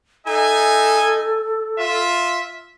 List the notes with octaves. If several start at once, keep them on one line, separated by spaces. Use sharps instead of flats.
D#4 A4 E5 G#5
F4 E5